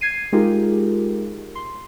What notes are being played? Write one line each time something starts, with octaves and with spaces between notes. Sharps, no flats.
G#6 C7 D#7
G#3 D#4 F4 G4 G#4 A#4
C6